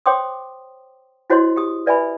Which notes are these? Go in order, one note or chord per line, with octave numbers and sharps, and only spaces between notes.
C5 C#5 G5 C6 D6 D#6
E4 F#4 C5 C#5 D#5 C6
G4 D#6
B4 D5 E5 G#5 B5